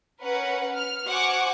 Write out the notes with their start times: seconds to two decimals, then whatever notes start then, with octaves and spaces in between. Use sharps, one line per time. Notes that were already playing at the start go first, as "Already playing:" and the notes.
0.22 C#4 A#4 B4 F#5
0.77 F6
1.07 F#4 C5 F#5 G#5 C#6 D6